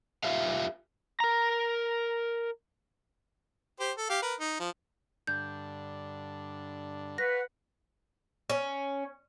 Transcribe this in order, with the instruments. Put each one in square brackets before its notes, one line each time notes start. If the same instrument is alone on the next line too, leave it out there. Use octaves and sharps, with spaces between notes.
[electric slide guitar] F4 G4 B4 E5 F5
[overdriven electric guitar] A#4 A#5
[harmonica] G4 C5
A4
G4 F5
A#4 B4
D#4
F3
[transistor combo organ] G2 D3 D4 [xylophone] G6
[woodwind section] B4 F#5 [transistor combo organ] C#5 F5 [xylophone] A#6
[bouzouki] C#4